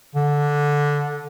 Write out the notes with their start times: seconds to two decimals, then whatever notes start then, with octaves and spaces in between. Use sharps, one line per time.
0.15 D3